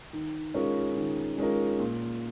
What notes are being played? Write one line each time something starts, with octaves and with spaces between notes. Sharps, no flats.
D#3
G#3 C#4 F4 A#4
D#3
G#3 C#4 F4 A#4
A#2